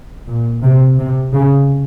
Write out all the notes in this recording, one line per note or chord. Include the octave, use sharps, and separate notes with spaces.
A#2
C3
C3
C#3